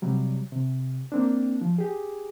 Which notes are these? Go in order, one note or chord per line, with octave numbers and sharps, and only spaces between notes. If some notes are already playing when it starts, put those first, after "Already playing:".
C3 F#3 G3
C3
A#3 C4 D4
F3
G4 G#4